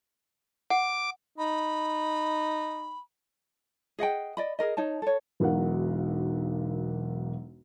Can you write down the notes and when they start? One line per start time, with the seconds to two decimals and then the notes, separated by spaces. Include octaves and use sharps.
0.70 F#5 D6
1.38 D#4 B5
3.99 G#4 D#5 F#5 G5
4.37 D5 D#5 B5
4.59 G#4 A#4 D#5
4.77 D#4 C#5 A5
5.02 A4 C#5
5.40 E1 B1 F#3 A#4 F5 F#5